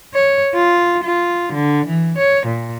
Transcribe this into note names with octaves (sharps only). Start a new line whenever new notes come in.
C#5
F4
F4
D3
E3
C#5
A#2